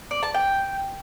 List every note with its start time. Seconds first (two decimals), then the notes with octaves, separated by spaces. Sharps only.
0.11 D5
0.23 A5
0.34 G5